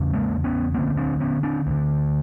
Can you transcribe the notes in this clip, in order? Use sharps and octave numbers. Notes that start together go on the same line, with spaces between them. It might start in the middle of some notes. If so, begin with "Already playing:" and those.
Already playing: E2 C#3
G#3 A#3
B3 C#4
D2 D3 A#3 C4
C4 D4
B3 C#4
C4 D4
D2 D3